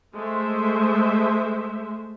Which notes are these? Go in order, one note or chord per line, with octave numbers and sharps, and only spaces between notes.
G#3 A3 C5 E5